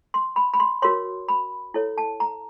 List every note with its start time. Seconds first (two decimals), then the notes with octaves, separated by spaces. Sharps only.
0.14 C6
0.36 B5
0.54 B5
0.60 C6
0.82 F#4 A#4 C#5 C6
1.28 B5
1.74 E4 A4 C#5
1.98 A5
2.20 A#5